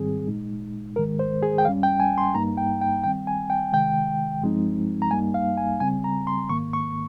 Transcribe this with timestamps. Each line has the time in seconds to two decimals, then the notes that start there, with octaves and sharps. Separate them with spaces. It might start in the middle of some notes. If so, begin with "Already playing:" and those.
Already playing: G#2 D#3 G3 C4 G#4
0.27 A#2 G#3 D#4
0.96 G#2 D#3 G#3 A#4
1.19 C5
1.42 G#4
1.58 G5
1.65 G2 G3 C#4 F5
1.83 G5
2.00 G#5
2.18 C6
2.34 G2 G3 A#3 D#4 A#5
2.57 G5
2.81 G5
3.04 D#3 G3 C4 G5
3.27 G#5
3.50 G5
3.73 C3 D#3 G#3 G5
4.42 G2 F3 G#3 C4 D#4
5.02 A#5
5.11 G2 G3 A#3 D#4 G#5
5.34 F5
5.57 G#5
5.80 C#3 G3 C4 G#5
6.04 A#5
6.27 C6
6.49 G#2 D#3 A#3 C#6
6.73 C#6